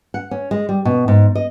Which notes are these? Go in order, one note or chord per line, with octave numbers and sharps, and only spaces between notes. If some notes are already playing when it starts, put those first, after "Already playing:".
F#5
C#4
G#3
G3
B2
G#2
D#5